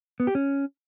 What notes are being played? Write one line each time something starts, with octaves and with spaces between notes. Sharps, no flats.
B3
G4
C#4